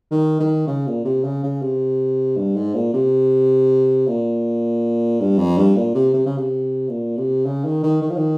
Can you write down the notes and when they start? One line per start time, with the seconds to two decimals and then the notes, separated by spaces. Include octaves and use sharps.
0.11 D#3
0.40 D#3
0.67 C#3
0.87 A#2
1.05 C3
1.24 C#3
1.43 C#3
1.62 C3
2.37 G2
2.56 G#2
2.74 A#2
2.94 C3
4.07 A#2
5.20 G2
5.38 F2
5.57 G2
5.76 A#2
5.94 C3
6.13 C3
6.26 C#3
6.37 C3
6.89 A#2
7.17 C3
7.46 C#3
7.65 D#3
7.83 D#3
8.02 D#3
8.10 F3
8.16 D#3